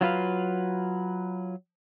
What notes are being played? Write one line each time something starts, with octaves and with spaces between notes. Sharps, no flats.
F#3 F4 B4 F5